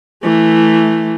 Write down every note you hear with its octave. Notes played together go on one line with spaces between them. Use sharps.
E3 A3